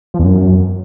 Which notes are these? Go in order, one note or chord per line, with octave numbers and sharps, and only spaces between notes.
F3
E2
F#2